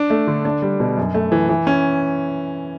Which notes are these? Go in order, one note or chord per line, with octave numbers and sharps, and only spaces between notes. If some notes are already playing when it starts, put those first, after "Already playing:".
Already playing: D4
A3
D3
D4
G3
B2
F#2
A3
E3
E3
C#4